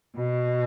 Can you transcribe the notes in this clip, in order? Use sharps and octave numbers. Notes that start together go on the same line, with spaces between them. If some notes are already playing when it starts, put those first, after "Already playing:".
B2